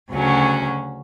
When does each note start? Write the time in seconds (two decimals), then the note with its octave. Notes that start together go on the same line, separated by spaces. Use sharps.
0.12 D2 C#3 F#3 C#4 F#4